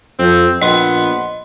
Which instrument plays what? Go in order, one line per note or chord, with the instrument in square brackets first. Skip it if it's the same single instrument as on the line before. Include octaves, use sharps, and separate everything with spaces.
[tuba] F2 [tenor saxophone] C4
[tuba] A#1 [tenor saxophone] B3 [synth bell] D#5 C6